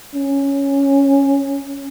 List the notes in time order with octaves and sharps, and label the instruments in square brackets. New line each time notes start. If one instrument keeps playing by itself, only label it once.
[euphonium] C#4